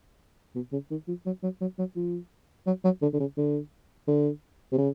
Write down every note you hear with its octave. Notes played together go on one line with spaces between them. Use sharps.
B2
C#3
D#3
F3
F#3
F#3
F#3
F#3
F3
F#3
F#3
D3
D3
C#3
D3
D3
C3
C#3